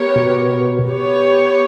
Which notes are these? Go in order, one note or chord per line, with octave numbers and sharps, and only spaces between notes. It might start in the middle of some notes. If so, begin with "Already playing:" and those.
Already playing: B3 G4 A#4 C#5
B2
B3 G4 C#5